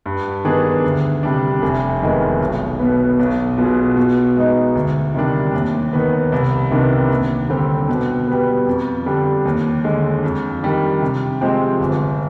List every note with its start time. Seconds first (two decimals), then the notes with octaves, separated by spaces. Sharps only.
0.06 G2
0.45 D#3 B3 D4 G#4
0.84 D2
1.23 C3 G3 D4
1.62 F1
2.02 F2 D#3 G#3 B3
2.40 B1
2.79 B2 B3
3.19 B1
3.58 B2 B3 F4 G#4
3.97 B2
4.36 G#3 B3 D#4
4.75 D2
5.15 C3 D#3 G3 D4
5.54 D#2
5.93 D#3 B3
6.32 C2
6.71 C3 D#3 B3 D4
7.10 D#2
7.50 D3 G3 C4 G4
7.89 B2
8.28 G3 B3
8.67 F2
9.06 D3 G3 D4 G4
9.46 D#2
9.84 D3 G#3
10.24 F2
10.63 D#3 G3 D4
11.02 C3
11.41 F3 G#3 C4 G4
11.81 G1